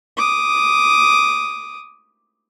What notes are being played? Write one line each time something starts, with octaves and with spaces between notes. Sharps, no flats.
D6 D#6